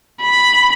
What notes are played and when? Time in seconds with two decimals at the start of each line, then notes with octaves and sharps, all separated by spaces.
0.21 B5